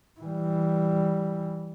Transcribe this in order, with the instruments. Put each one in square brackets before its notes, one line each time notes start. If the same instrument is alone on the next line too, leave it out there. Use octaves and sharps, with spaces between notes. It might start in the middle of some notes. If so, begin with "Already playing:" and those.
[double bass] E3 G3